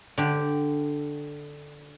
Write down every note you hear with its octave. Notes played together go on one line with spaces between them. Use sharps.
D3 G4